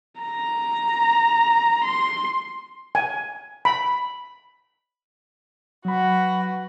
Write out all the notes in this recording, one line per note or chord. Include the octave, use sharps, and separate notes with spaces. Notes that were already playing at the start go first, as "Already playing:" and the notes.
A#5
C6
G#5
B5
F#3 F#4 B4 B5